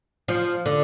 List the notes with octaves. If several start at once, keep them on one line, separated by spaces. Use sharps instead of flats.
F3
D3